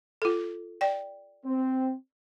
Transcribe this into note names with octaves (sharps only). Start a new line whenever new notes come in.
F4 A4
D5 G5
C4